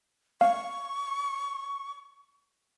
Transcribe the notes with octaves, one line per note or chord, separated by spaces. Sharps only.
F5 C#6